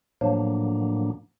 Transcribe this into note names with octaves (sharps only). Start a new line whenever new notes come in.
A2 F3 F#3 A#3 D4